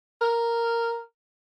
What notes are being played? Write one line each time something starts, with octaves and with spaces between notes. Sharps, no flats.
A#4